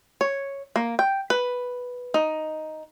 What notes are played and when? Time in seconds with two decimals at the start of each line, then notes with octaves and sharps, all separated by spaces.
0.21 C#5
0.76 A#3
0.99 G5
1.30 B4
2.14 D#4